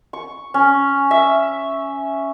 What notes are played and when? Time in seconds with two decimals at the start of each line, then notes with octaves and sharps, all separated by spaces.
0.13 C#6
0.54 C#4
1.11 E5